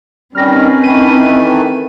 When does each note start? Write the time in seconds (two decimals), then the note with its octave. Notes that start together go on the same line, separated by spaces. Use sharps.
0.35 D#3 G3 C4 C#4 B4 F6 A#6
0.84 D#3 E3 A3 D#7